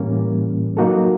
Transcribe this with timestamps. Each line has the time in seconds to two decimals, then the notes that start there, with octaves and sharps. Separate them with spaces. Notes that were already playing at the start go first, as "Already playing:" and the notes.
Already playing: A2 E3 G3 A#3 C#4
0.77 F#3 A#3 D#4 F#4 A4